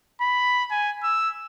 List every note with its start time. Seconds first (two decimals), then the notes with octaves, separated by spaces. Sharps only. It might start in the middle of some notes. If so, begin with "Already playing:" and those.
0.21 B5
0.71 G#5
1.03 E6